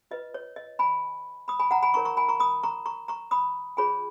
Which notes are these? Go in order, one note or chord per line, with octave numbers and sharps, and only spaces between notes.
F4 B4 D#5
C#5
D#5
G#5 B5
B5 D#6
G#5 B5
F#5 A#5
G#5 B5
D#4 A#4 C#5 A#5 C#6
A#5 C#6
G#5 B5
A#5 C#6
B5 D#6
A#5 C#6
A#5 C#6
A#5 C#6
B5 D#6
F4 G#4 C#5 G#5 B5